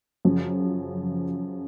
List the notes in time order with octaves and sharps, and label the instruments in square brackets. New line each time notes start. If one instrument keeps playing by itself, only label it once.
[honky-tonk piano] F#2 C#3 F3